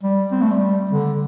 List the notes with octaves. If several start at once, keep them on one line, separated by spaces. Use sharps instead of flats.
G3
C4
A3
G3
D3